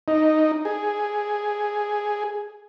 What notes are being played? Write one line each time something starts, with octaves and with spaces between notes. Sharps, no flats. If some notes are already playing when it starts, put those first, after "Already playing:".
D#4
G#4